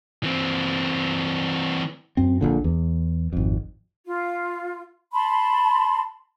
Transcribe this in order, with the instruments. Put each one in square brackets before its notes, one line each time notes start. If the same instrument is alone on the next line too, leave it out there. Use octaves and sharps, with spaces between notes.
[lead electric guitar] E3 C4
[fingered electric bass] F#2 C4
A#1 A#2 D3
E2
G#1 F2
[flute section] F4
A5 B5 C6